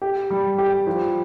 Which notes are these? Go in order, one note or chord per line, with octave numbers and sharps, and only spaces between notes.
G4
G3
G4
F3